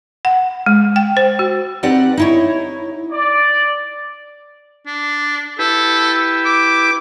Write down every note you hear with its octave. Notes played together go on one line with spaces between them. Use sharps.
F#5
G#3
G5
C5
F#4
C4 D#4 G4 B4 D5 F#5
D#4 E4 C#5
D5
D4
E4 G4 A4 B4
D6